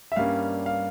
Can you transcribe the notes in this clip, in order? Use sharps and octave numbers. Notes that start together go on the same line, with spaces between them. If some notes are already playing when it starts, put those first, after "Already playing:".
E5
G2 G3 A#3 C#4 F5
F5